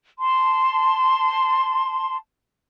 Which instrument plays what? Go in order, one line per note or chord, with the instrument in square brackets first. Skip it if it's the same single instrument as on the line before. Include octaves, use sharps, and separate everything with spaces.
[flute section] A5 C6